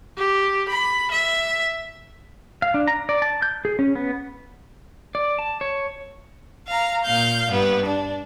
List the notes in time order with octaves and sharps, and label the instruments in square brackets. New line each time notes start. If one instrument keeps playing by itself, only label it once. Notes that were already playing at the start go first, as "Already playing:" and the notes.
[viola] G4
B5
E5
[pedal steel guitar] F5
D4
A#5
D5
A5
G6
G#4
C#4
B3
D5
A5
C#5
[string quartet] F5 A#5
A#2 F5 G6
G2 B3
D4